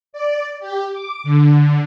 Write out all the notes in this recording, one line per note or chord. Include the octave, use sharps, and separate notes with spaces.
D5
G4
D6
D3